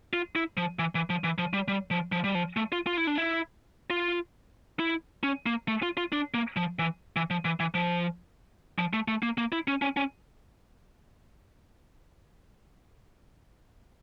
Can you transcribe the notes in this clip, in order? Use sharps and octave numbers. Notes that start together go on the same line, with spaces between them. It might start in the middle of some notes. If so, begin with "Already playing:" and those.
F4
E4
F3
E3
E3
F3
E3
F3
G3
G3
F3
F3
G3
F3
A3
F4
F4
E4
D4
E4
F4
E4
C#4
A#3
A3
F4
F4
D4
A#3
F3
E3
E3
F3
E3
E3
F3
F3
A3
A3
A#3
A#3
E4
C#4
C#4
C#4